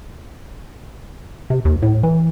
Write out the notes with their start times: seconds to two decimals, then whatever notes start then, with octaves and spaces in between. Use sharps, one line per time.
1.50 C3
1.65 D#2
1.82 A2
2.03 E3